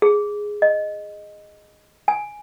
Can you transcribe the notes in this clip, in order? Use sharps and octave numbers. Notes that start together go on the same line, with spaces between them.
G#4
D#5
G#5